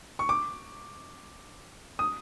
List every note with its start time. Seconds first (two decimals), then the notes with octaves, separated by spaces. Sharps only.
0.19 C#6
0.29 D6
1.99 D#6